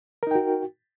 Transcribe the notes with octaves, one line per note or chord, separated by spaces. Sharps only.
D#4 F#4 A#4 G5